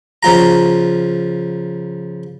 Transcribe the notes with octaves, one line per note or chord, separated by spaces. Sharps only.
C#3 F3 F4 A#5